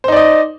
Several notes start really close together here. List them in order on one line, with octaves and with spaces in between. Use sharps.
C5 D#4 D5 D#5